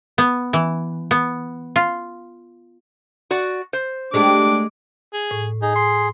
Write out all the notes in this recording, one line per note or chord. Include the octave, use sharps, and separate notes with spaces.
B3
E3
B3
F4
F#4 D5 F#5
C5
G#3 A3 D4 G4 D6
G#4
A2
D#4 G#4
C6